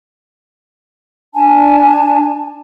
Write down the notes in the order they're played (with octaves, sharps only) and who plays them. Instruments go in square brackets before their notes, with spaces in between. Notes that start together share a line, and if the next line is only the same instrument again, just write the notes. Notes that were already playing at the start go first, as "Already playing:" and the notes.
[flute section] D4 G#5 A5